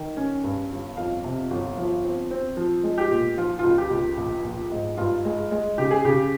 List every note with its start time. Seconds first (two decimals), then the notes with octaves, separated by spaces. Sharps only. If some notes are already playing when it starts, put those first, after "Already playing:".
Already playing: D#3
0.17 C#4
0.44 G2
0.71 G1
0.97 F2 F5
1.24 C3
1.51 G1
1.77 F3
2.04 C4
2.31 C4
2.57 F3
2.84 G#3
2.98 G4
3.11 A#2
3.37 F3 F4
3.59 F4
3.64 C#2
3.78 G4
3.90 C#2
4.17 A#1
4.44 A#1
4.71 G#2
4.98 G2 F4
5.25 G#3
5.51 G#3
5.78 C#3 G4
5.91 G#4
6.05 C#3 G4